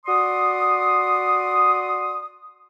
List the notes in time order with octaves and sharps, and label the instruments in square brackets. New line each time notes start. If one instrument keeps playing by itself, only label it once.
[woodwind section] F#4 D5 C6 D#6